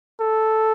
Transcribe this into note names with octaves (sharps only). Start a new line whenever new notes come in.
A4